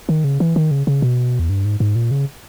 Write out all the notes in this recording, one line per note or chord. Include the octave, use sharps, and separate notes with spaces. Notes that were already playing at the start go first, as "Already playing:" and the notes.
D#3
C#3
E3
D#3
C#3
C#3
B2
E2
G2
G#2
G#2
A#2
C#3